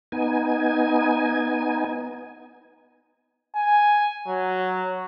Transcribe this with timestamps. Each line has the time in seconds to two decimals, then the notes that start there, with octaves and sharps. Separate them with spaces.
0.12 B3 D#4 G#5
3.56 G#5
4.28 F#3